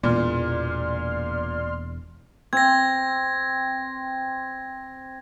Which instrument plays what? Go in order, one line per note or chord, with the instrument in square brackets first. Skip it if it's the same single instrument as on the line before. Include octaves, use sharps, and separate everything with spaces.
[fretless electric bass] E1 E2 [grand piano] A#2 [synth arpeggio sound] D5 C6 F6
[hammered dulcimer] C4 [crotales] G#6 A#6